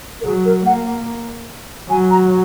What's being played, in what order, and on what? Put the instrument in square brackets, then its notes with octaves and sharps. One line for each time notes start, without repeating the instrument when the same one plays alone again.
[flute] A#4
[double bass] F#3 [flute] G#4
[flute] A#4
[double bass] A#3 [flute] F#5
[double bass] F#3 [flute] G#5
[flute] A#5